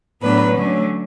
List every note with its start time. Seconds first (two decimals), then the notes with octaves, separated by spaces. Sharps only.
0.22 A2 F#3 B3 D4 B4
0.54 D3 F#3 A3 C#4